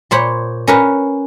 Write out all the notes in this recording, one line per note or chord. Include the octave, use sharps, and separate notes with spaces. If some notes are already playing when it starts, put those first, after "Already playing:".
A#2 C5 C#5 B5
C#4 A#4 B4